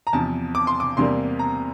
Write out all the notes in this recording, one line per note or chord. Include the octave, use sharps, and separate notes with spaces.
A#5
E2 C3 F3 A5
D6
C6
D6
E2 C3 G3 A#3 C6
A#5